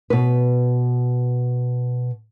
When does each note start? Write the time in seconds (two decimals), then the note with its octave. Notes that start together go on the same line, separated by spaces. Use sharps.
0.10 B2 B4